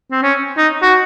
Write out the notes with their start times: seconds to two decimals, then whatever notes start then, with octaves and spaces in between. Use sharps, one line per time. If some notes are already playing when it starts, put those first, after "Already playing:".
0.12 C4
0.23 C#4
0.57 D#4
0.82 F#4